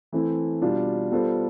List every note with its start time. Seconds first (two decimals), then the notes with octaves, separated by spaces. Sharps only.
0.12 E3 A3 C4 E4
0.62 B2 G3 D4 F4
1.11 G3 B3 F4 A4 C5